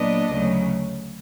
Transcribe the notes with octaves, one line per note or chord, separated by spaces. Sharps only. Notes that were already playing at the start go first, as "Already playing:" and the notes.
Already playing: A#2 F#3 B3 D4 D#5
D2 C#3 F#3